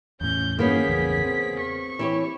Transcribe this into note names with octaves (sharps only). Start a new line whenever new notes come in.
E2 A2 C#4 G6
G2 D#3 E3 A#3 B3 C#4 G#4 B6
A1 E2 C#3
C4
C#6
E3 G4 C#5